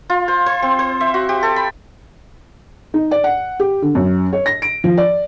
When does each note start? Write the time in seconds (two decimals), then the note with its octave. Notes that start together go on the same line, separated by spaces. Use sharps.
0.10 F4
0.28 C5
0.46 C5
0.62 C4
0.79 C5
1.01 E5
1.14 F#4
1.29 G4
1.43 A4
1.56 B5
2.94 D#4
3.11 D5
3.24 F#5
3.60 G4
3.82 D3
3.95 F#2
4.33 C#5
4.46 A#6
4.62 D7
4.84 F3
4.97 D5